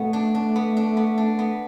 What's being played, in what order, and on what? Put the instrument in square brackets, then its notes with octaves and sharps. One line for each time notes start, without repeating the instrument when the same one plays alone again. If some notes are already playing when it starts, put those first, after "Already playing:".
Already playing: [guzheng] B2 B3 [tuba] A3
[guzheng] D4
D4
B3
D4
B3
D4
B3